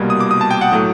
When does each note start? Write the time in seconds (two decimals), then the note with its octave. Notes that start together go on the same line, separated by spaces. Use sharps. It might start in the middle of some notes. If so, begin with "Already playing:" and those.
Already playing: C2 B2 G3 A#3
0.10 D#6
0.20 D6
0.31 D#6
0.41 A5
0.51 G5
0.61 F#5
0.72 A2 F#3 A3